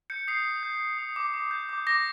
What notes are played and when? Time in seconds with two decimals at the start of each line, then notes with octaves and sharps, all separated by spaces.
0.10 G6 C#7
0.28 D#6 C7
0.45 D#6
0.63 G6
0.81 G6
0.98 D#6
1.16 D6
1.34 D6
1.51 G6
1.69 D6
1.87 D6 A#6